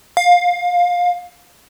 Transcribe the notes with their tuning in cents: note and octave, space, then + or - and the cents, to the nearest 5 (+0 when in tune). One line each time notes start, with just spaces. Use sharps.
F5 +20